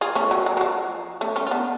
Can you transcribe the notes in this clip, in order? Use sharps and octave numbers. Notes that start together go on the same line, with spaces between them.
F4 G#4
A3 C#4
F#3
F#3
F#3
F3
A3 C#4
C#4 F4
F4
B3 D4